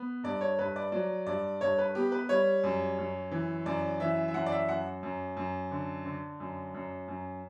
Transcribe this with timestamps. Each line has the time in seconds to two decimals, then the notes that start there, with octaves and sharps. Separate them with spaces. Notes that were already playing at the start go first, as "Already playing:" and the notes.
Already playing: B3
0.24 G2 D5
0.41 C#5
0.58 G2 B4
0.76 D5
0.92 F#3 D5
1.26 G2 D5
1.61 G2 C#5
1.78 B4
1.95 B3 G4
2.12 B4
2.29 G3 C#5
2.64 F#2
2.98 F#2
3.31 E3
3.66 F#2 D5
4.00 E3 E5
4.28 E5
4.34 F#2 F#5
4.46 D5
4.52 E5
4.69 F#2 F#5
5.03 F#2
5.37 F#2
5.71 D3
6.05 D3
6.40 F#2
6.74 F#2
7.08 F#2